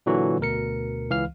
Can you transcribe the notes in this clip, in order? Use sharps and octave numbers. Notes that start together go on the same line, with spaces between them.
A#2 D3 E3 F#3 F#4
D2 B2 A#4 C#7
C#2 E3 F5 F6